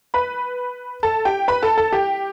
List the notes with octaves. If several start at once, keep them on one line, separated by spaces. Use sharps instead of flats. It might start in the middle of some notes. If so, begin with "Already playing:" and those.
B4 B5
A4 A5
G4 G5
B4 B5
A4 A5
A4 A5
G4 G5